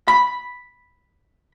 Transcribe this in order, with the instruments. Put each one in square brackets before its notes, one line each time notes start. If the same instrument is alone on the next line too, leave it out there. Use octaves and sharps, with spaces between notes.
[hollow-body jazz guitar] B5